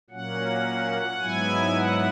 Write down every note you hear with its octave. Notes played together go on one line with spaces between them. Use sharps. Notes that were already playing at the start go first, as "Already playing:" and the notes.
A#2 F#3 A#3 C#4 F#5
G#2 F#3 B3 E4 G#5
F#5